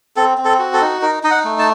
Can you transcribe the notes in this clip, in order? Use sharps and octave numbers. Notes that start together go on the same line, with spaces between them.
C4 A4
C4
A4
F#4
A4
D#4
D#4 A#4
D#4 D#5
F#5
A3
A5